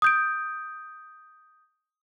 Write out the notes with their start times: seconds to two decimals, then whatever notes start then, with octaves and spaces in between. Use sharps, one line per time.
0.02 D#6 G6 D7